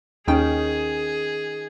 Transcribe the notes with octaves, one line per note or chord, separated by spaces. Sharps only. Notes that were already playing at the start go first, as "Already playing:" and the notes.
D#2 D#3 C#4 D#4 G#4 G5